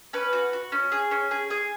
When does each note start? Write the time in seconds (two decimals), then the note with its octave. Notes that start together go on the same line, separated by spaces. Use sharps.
0.13 C#4 B4
0.33 F#4
0.53 F#4
0.72 C#4
0.92 G#4
1.11 C#4
1.31 G#4
1.50 G#4